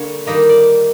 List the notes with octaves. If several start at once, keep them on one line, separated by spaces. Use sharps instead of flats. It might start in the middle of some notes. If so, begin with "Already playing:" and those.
Already playing: D3 G3 A#3 C#5
D#3 G3 A#3 D#5
D5